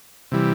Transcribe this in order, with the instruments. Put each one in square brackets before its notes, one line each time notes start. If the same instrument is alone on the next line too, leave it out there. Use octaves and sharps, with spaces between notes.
[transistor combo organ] C3 E3 G3